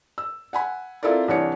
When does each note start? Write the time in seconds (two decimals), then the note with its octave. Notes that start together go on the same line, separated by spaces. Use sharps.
0.18 E6
0.53 F#5 G#5 B5
1.03 C4 E4 F4 A4 A#4 D5
1.28 C2 E3 D4 C#5 C#7